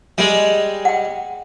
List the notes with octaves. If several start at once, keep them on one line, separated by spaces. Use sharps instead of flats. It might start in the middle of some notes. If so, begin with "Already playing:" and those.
G3 G#3
F#5 G5